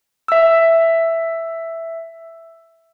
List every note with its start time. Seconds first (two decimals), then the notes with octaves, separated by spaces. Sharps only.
0.28 E5 E6